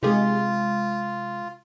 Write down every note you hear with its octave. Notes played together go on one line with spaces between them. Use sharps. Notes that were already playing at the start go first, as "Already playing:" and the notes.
C3 G#3 D#4 F4 G4 G#4